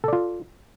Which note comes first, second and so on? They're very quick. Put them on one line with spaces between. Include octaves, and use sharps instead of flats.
A4 D5 F4